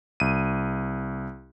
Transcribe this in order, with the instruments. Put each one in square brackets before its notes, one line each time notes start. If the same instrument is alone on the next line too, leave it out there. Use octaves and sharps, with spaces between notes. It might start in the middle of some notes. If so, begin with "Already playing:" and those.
[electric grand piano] C2 D#7